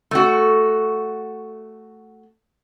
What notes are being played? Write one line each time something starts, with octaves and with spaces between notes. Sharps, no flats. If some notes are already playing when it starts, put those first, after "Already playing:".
A3 F#4